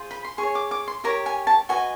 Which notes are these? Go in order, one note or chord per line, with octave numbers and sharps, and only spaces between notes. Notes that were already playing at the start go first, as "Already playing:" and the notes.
Already playing: F4 G#4 C5
B5
C6
G#4 C#6
C#5
D6
D6
C6
G4 A#4 C#5 A#5
G#5
A5
F#4 B4 D#5 G#5